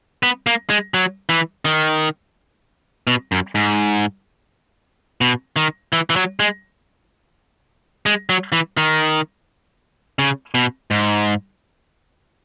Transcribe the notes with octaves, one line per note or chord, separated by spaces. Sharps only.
B3
A#3
G#3
F#3
E3
D#3
B2
F#2
G#2
B2
D#3
E3
E3
F#3
G#3
G#3
F#3
E3
D#3
C#3
B2
G#2